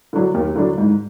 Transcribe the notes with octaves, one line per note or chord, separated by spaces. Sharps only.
D3 F#3 D4
D#2
D3 F#3 D4
G#2